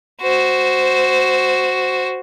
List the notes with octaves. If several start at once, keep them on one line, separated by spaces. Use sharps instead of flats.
F#4 C5